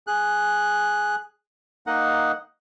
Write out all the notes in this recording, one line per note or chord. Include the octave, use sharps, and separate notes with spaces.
G#4 F#6
A#3 D#4 D#5 F#5